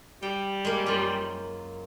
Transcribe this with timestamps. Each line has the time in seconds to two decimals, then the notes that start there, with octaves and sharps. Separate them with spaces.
0.22 G3 G5
0.65 G#3 A#3
0.86 F#2 F4